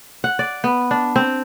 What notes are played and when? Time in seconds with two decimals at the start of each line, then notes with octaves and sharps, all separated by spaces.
0.24 F#5
0.39 D5
0.64 B3
0.91 D4
1.16 C4